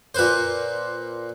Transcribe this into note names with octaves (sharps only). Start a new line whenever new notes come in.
A#2 B4 C5